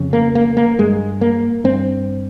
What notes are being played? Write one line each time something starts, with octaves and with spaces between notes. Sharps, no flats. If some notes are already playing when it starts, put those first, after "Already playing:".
Already playing: F2 C#3
A#3
A#3
A#3
G2 G#3
A#3
G2 C4